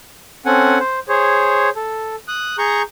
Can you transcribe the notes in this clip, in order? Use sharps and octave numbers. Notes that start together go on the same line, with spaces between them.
C4 C#4 A4 F#5 G#5
C5
G#4 C5 C#5
A4
D#6 F#6
G#4 A#5 C#6 G6